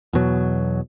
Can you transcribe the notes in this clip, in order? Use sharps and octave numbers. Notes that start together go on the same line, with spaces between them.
E2 B2 F#3